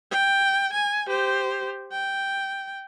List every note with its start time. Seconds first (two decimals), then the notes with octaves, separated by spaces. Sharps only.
0.11 G5
0.73 G#5
1.07 G4 C5
1.92 G5